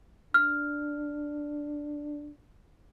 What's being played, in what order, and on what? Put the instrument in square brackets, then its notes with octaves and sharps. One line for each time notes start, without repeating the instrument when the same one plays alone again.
[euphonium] D4 [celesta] F6